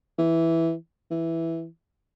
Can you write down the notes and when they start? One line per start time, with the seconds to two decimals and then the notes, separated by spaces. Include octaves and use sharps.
0.19 E3
1.11 E3